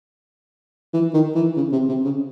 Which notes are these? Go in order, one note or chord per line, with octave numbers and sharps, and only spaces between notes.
E3
D#3
E3
C#3
C3
C3
C#3